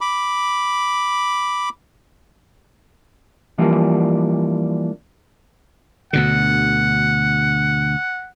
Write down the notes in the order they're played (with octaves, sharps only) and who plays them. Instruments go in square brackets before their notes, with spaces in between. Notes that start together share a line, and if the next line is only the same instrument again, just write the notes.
[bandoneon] B5 D6
[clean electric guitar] E3 F3 G3 A#3 D4
[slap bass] D2 B2 D3 [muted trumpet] F#5